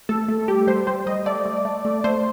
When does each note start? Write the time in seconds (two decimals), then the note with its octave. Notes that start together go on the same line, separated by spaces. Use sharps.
0.09 A3 A4
0.28 A3
0.48 G3 G4
0.67 G3 C5
0.87 G3 C5
1.07 G3 D#5
1.26 A3 D5
1.45 A3
1.65 A3
1.85 A3
2.04 A3 C5